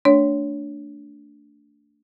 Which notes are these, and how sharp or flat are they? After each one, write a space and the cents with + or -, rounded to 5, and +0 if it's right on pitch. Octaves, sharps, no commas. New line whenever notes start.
A3 +20 D4 -10 C#5 +10